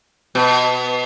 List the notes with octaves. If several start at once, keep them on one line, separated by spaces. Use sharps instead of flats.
B2